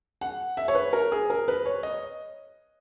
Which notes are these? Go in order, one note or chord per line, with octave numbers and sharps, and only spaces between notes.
F#5
E5
C#5
B4
A#4
G#4
A#4
B4
C#5
D#5